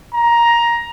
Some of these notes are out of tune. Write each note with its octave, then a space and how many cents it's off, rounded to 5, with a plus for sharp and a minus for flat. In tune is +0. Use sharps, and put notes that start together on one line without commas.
A#5 +10